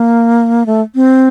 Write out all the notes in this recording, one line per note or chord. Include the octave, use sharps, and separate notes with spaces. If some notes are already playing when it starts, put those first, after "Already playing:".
Already playing: A#3
A3
C4